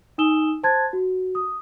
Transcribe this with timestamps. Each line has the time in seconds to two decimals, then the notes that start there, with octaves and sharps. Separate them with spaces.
0.18 D#4 G#5 D#6 E6 E7 G7
0.63 C5 A5 C6 F#6 G#6 A6
0.93 F#4
1.35 D#6